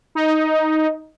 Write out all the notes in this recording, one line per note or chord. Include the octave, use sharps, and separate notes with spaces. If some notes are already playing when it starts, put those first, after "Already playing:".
D#4